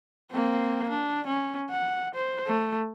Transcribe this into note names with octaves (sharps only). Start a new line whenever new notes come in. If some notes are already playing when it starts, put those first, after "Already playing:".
A#3 C4
D4
C#4
F#5
C5
A3